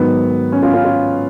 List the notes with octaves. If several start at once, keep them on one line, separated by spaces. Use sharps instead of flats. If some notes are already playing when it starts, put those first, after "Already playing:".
Already playing: G#2 D#3 F#3 B3
C#4
C#4 F4
C#4 F4
C#4 F4